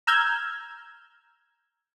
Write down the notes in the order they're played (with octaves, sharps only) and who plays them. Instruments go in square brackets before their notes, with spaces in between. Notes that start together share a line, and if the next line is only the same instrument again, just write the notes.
[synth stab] A#5 E6 F6 G6 G#6